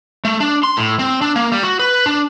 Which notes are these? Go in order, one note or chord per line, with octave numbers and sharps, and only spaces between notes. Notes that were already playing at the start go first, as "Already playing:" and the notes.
A3
D4
C6
A2
C4
D4
A#3
G3
F#4
B4
D4